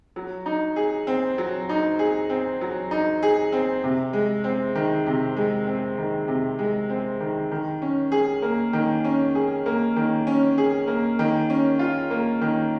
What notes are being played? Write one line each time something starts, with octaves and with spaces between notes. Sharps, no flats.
F#3
D#4
G#4
C4
F#3
D#4
G#4
C4
F#3
D#4
G#4
C4
C3
G#3
C4
D#3
C3
G#3
C4
D#3
C3
G#3
C4
D#3
D#3
C#4
G#4
A#3
D#3
C#4
G#4
A#3
D#3
C#4
G#4
A#3
D#3
C#4
F4
A#3
D#3